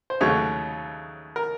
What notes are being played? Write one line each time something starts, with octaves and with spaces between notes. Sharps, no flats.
C5
D#2 C#3 F#3 A3 C#5
A#4